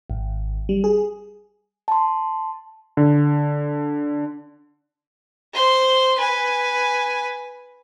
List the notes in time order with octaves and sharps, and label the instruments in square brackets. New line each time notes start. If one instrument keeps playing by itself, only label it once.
[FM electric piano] G#1
G3
G#4
[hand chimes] A5 C6
[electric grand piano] D3
[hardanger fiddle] C5 C6
B4 G#5